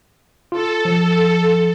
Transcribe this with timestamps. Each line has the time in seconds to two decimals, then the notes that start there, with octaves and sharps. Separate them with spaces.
0.52 F4 A4
0.85 F3